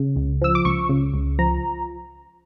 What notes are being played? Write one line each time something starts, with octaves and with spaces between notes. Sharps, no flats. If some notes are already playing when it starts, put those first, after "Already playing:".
Already playing: C#3
C#2
F3 E6
D6
C#2 C#6
C#3
C#2
F3 A#5